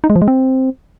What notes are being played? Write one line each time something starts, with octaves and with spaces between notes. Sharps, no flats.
D#4
G#3
F3
G#3
C4